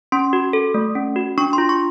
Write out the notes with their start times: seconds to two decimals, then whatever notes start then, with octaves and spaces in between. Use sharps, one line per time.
0.12 C#4 C6
0.33 F#4
0.53 A4
0.74 A3
0.95 C#4
1.16 F#4
1.38 D4 C#6
1.53 C6
1.58 F4
1.69 C#6